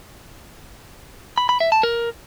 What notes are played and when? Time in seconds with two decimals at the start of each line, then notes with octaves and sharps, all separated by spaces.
1.38 B5
1.49 B5
1.60 E5
1.72 A5
1.83 A#4